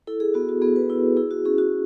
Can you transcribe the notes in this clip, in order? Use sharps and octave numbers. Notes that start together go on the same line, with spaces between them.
E4 A4
G#4
B3 F#4
F#4
B3 G#4
B4
E4
E4 G#4
F#4
C#4 G#4
F#4